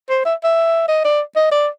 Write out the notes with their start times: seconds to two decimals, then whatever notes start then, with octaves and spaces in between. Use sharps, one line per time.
0.09 C5
0.25 E5
0.44 E5
0.88 D#5
1.04 D5
1.36 D#5
1.51 D5